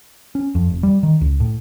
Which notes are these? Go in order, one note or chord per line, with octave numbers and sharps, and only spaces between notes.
C#4
F2
F1
G3
D#3
C#2
A2